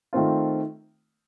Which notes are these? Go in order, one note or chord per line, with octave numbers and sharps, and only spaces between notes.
D#3 A3 C4 F4